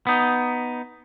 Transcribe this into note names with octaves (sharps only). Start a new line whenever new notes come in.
B3 D#4